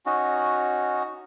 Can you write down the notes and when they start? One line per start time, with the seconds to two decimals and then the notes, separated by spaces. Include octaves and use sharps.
0.06 C#4 D#4 F#4